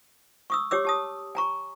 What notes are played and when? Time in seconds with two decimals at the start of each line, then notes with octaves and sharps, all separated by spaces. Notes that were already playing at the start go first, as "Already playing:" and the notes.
0.50 C#6 D#6 E6
0.71 G4 C#5 D6 E6
0.85 G4 A5 D#6
1.35 G#5 A#5 C#6